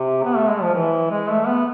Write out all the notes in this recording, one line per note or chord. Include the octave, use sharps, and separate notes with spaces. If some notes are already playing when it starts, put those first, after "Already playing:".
Already playing: C3
B3
A3
G#3
F3
E3
G#3
A3
B3